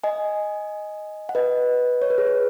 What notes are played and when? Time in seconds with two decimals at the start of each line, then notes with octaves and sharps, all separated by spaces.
0.04 D#5 G#5
1.29 F#5
1.35 B4 D#5
2.02 C#5
2.10 B4
2.18 G#4
2.27 B4